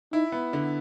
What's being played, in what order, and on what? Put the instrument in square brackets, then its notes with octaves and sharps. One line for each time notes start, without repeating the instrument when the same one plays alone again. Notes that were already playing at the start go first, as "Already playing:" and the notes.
[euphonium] D#4 [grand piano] E4
[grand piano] B3
D3